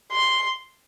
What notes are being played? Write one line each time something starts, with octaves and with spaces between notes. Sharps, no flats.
C6